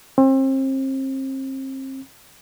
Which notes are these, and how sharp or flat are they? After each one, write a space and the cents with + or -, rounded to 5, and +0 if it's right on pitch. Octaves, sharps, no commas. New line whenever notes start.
C4 +35